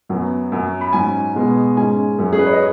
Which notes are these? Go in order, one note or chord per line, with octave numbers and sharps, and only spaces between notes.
F#2 F#3 B3
F#2 F#3 C#4
B5
G#2 F#3 C#4 G#5
B2 G#3 B3
G#2 G#3 C#4 G#5
F#2 F#3 C#4
G#4
B4
C#5
D#5